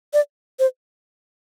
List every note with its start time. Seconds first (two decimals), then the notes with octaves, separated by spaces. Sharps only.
0.14 D5
0.59 C5